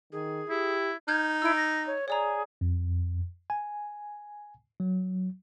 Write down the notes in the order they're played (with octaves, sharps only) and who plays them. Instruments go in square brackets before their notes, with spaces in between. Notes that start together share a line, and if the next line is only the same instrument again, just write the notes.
[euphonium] D#3 [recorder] G#4
[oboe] E4 [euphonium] G4
[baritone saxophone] D#4 [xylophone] F6 G6 G#6
[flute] E4 [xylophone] E6 G#6 D7
[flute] A#6
C#5
[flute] G#4 [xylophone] C#5 D5 A#5
[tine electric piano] F2
G#5
F#3